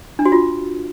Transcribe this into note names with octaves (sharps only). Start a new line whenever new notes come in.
D4
F#4
F4